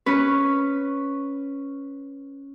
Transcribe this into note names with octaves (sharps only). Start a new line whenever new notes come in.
C#4 B4